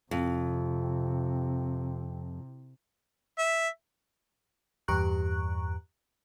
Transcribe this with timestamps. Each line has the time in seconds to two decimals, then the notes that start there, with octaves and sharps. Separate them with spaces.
0.11 F2 C3
3.38 E5
4.88 E2 G2 G4 A#5 C#6 F#6